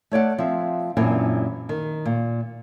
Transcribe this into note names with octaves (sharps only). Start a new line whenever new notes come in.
A3 C#5 D5 F#5
F3 C4 E5
F#2 A#2 E3 C4 D4
D#3
A#2